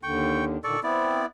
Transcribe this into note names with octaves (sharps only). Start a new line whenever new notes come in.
D#2 D3 G5 C#6
A#2 D3 D#3 A4 D5 C#6
B3 C4 E4 D5